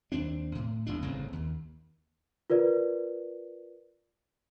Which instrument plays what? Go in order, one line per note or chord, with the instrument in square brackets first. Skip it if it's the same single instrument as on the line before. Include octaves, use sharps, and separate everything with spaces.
[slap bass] D#2 C4 D4
A2
G1 E2 D4
G1 A2 C#3 C4
D#2
[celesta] F4 A#4 B4 D5